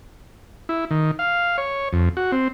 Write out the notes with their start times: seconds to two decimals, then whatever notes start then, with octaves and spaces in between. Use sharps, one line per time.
0.69 E4
0.91 D#3
1.19 F5
1.58 C#5
1.93 F2
2.17 F#4
2.32 C4